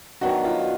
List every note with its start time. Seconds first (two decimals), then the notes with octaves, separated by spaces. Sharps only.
0.21 D#3 F#3 B3 D4 F#4
0.44 F4